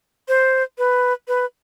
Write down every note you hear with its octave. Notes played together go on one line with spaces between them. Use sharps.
C5
B4
B4